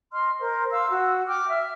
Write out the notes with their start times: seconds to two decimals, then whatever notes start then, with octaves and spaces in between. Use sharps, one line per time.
0.13 D#5 C6 F6
0.38 A#4 C5
0.72 F5 C6 E6
0.91 F#4 E6
1.27 G5 D6 F6
1.48 E5 F6